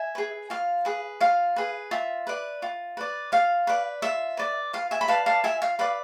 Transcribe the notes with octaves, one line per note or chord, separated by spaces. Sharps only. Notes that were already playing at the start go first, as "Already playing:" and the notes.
Already playing: E5 G#5
G#4 B4
F4 F5
G#4 B4
F4 F5
G#4 B4
F4 E5
B4 D5
F4
B4 D5
F4 F5
B4 D5
F4 E5
B4 D5
F4 F5
E5 G#5
B5
B4 D5 F5 A5
F5 A5
F4 E5 G#5
F5
B4 D5 F5